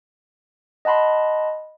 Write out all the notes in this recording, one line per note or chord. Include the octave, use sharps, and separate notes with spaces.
D#5 F#5 A5 B5 C6